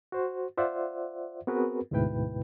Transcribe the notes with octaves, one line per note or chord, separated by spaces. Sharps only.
F#4 C5
F4 C5 D5 E5 F#5
B3 C4 F#4 G#4 A#4 B4
D2 G#2 B2 E4 B4 G5